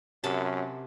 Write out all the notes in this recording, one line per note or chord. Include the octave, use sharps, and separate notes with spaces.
F#2 C3 A5